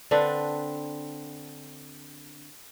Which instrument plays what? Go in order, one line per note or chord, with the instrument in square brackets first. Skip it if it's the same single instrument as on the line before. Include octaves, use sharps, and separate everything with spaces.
[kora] D3 C4 D4 B4